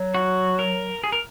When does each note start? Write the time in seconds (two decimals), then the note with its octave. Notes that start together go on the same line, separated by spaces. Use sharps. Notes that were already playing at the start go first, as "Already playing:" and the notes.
Already playing: F#3
0.15 F#4
0.59 A#4
1.04 G#4
1.12 A#4